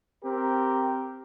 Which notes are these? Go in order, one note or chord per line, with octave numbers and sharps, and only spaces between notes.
C4 G4 A#4